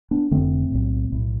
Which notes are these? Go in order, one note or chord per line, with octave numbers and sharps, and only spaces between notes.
B3 D4
F1 F2 D3 A3 C4
B1 A2
B1 A2